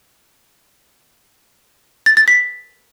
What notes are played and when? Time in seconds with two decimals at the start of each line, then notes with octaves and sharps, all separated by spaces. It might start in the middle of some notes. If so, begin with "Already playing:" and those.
2.06 A6
2.17 A6
2.28 B6